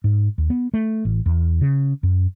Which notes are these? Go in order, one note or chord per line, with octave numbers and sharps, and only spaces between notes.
G#2
D#2
B3
A3
A1
E2
C#3
F#2